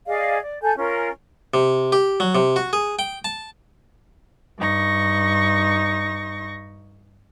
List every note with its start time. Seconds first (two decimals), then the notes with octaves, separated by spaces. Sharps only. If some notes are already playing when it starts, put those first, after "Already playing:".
0.07 G#4 D5 D#5 F5
0.42 D5
0.62 A4 G#5 G6
0.77 C#4 F4 A#4
1.54 C3
1.92 G4
2.20 F#3
2.35 C3
2.56 F#4
2.73 G#4
2.99 G5
3.25 A5
4.58 G2 D#4 C#6 A#6